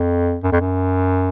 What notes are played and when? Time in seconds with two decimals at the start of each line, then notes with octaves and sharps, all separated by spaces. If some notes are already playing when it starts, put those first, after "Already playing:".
Already playing: F2
0.44 F#2
0.52 F2
0.61 F#2